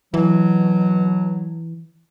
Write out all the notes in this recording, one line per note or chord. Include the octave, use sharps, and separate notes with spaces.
B2 E3 F#3